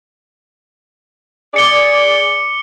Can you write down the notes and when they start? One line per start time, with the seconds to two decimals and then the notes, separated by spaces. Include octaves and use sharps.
1.54 G#4 D5 D6 C#7 G7